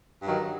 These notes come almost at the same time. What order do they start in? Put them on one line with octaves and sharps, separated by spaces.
G2 F#3 D#3